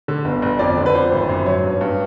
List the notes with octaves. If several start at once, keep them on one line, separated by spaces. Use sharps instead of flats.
D3
G1
G1
F2 D5
D3
B4
F3 C5
G#1
F#2
F#3 C#5
G2
G2